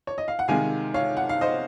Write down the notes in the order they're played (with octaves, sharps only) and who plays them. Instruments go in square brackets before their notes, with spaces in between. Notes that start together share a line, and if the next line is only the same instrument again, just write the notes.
[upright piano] C#5
D#5
F5
F#5
C3 D#3 G#3 F5 G#5
C#5 F5
F#5
F5
C5 D#5